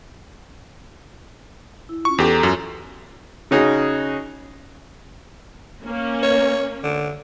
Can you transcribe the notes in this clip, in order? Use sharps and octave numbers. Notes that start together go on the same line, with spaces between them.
E4
C#4 F4 C#6
E2 G4 A4
A#5
F#2 F4 F#4
C#3 C#4 D#4 F#4 G#4
A#3 C#4
C#5
D3